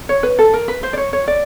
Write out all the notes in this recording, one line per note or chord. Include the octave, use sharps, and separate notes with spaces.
C#5
B4
A4
A#4
B4
C5
D5
C#5
C#5
D5